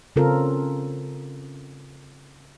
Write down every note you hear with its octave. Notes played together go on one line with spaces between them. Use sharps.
C#3 C4 C#4 F4 A4 A#4